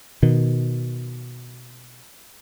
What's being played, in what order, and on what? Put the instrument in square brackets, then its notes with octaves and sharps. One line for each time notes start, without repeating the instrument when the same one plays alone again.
[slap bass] B2 D#3